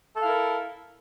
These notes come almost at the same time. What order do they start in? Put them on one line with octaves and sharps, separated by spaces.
A4 F5 E4 A#4